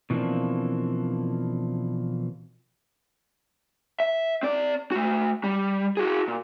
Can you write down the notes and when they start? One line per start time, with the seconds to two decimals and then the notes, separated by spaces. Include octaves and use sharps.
0.10 B2 E3 F3 A#3 C4 D4
4.00 E5
4.43 C4 D5
4.92 A3 F#4
5.44 G3
5.97 F#4 G#4
6.28 A#2